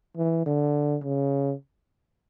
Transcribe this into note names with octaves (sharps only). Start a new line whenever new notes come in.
E3
D3
C#3